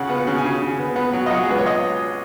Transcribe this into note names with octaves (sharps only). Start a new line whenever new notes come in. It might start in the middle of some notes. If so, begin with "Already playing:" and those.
Already playing: C#3 F#5
B3
F#5
C#3
G#5
C#3
C#3
B3
B3
F#3
D#5
F#3 F#5
G#4
C#2 B4
C#5
D#5